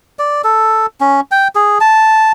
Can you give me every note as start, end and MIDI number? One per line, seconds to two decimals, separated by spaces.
0.19 0.42 74
0.44 0.86 69
1.01 1.21 61
1.31 1.48 79
1.55 1.78 68
1.80 2.32 81